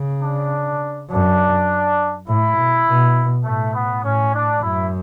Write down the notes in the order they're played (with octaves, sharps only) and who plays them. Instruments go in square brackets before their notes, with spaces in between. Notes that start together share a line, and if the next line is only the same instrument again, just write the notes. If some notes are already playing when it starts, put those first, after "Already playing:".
Already playing: [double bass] C#3
[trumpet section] D4
[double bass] F#2 [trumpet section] D4
[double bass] A2 [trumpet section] E4
[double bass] B2
B2
[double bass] A2 [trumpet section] A3
[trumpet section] B3
[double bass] A2 [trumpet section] C#4
[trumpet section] D4
[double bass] F#2 [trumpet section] E4